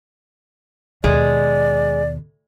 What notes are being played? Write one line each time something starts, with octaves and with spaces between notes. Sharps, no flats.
D#2 B2 G#3 D5